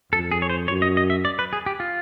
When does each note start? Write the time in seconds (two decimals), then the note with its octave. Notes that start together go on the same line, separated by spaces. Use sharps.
0.13 F2 A4
0.32 G#4
0.42 C#5
0.50 C5
0.68 F#2 C#5
0.82 D#5
0.97 D#5
1.10 E5
1.25 D5
1.39 B4
1.53 G#4
1.66 G4
1.80 F4